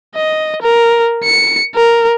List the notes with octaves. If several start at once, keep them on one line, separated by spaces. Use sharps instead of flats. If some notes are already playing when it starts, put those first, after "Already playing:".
D#5
A#4
C#7
A#4